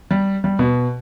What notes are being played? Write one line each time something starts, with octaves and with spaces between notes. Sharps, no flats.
G3
G3
B2